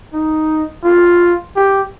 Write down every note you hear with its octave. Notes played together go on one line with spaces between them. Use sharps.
D#4
F4
G4